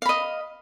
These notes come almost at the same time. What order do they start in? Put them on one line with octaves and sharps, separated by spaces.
F5 B5 D#5